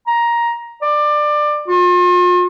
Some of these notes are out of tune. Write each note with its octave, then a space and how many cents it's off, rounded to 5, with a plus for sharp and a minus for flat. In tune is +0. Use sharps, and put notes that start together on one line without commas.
A#5 +10
D5 +20
F4 +40